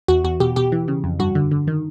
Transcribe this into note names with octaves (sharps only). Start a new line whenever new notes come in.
E2 F#4
E2 F#4
B2 G4
B2 G4
E3
C#3
F2
G2 F#4
D3
D3
D#3